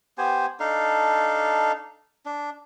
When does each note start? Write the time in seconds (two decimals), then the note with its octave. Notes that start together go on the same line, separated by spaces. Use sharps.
0.18 B3 G4 C5 G#5
0.60 D4 D#4 A4 F5
2.26 D4